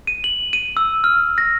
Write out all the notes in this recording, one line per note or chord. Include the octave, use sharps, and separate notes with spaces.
D#7
F#7
D#7
E6
F6
A#6